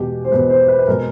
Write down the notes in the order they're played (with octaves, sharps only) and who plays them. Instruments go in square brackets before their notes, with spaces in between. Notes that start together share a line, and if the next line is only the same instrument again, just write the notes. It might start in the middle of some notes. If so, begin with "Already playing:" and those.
Already playing: [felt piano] E2 B2 G#3 [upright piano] G4
[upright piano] C5
[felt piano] E2 B2 G#3 [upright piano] B4
[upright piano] C5
B4
B4
[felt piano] B2 G#3 [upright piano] A#4